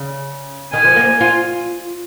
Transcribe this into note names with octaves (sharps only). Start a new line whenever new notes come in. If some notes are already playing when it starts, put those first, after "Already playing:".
Already playing: C#3
D#3 G#5
F3
A#3
F4